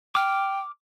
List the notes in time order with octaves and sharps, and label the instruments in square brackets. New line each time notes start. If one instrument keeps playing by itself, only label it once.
[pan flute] G5 [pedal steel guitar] D6 F6